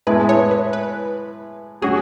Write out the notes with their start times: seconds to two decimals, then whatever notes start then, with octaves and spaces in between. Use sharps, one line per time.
0.07 A2 G#3 B3 E4 B4
0.29 C#5
0.51 B4
0.73 B4
1.82 F#3 C#4 F#4 G#4